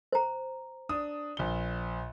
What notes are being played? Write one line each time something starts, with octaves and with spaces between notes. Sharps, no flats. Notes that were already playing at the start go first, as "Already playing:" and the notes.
C5 A#5
D4 D#6
A#1 G7